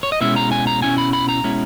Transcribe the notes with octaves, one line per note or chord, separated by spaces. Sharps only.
C#5
D#5
B2 G#3 C#4 E4 E5
A#5
G#5
A#5
B2 G#3 C#4 E4 G#5
B5
B5
A#5
B2 G#3 C#4 E4